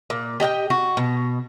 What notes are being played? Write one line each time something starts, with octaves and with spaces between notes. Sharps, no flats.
A#2
G4 D#5 F#5 G5
F#4
B2